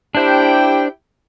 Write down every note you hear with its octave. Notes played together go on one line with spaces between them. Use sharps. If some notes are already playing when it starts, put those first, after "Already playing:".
D4 E4 G4 C5 G5